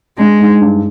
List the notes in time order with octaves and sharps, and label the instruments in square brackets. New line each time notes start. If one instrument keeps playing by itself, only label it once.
[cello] G#3 [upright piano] D4
[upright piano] G#2
G2